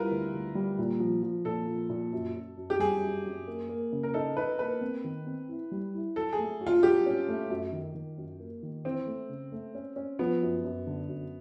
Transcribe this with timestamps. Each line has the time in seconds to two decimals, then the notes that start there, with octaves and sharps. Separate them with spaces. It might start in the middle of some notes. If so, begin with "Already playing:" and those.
Already playing: G3 E4 F4 A#4 B4
0.11 D2
0.34 D2
0.55 G3
0.79 A#2
1.00 F3
1.23 F3
1.45 A#2 A4
1.68 F3
1.90 A#2
2.13 F#2
2.35 F#2
2.57 F#2
2.70 G4
2.79 G3 G#4
3.02 F#2
3.25 F#2
3.47 A#3
3.69 A#3
3.92 C#3
4.03 A#4
4.14 D#4 A4
4.36 D#4 B4
4.59 A#3 B4
4.81 C4
5.04 D#3
5.26 C4
5.48 E4
5.72 G3
5.94 E4
6.16 F#3 A4
6.33 G#4
6.39 A3
6.61 F#4
6.67 F4
6.83 F#3 G4
7.06 C#4
7.28 A3
7.50 F#2
7.72 D#3
7.95 D#3
8.18 F#2
8.40 A#3
8.63 D#3
8.84 E3 C4
9.07 A3
9.29 C#3
9.52 A3
9.75 C#4
9.96 C#4
10.19 F3 B3
10.42 F#2
10.64 F#2
10.87 D3
11.08 F#2